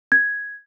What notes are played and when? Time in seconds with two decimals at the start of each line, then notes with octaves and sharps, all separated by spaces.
0.12 G#6